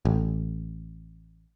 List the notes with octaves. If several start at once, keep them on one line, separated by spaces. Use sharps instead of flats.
A1